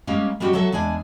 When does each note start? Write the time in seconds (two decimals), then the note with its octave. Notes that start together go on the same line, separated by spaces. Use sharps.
0.07 G3 G#3 A#3 C#4
0.40 G3 G#3 C#4 D4 F#4 G4
0.53 F#3 F#4 A4 E5
0.72 E2 G#3 D4 G#5